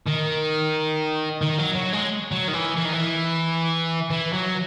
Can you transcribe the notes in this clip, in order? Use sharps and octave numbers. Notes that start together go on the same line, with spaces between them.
D#3
D#3
F#3
F#3
G#3
F#3
D#3
E3
E3
D#3
E3
E3
F#3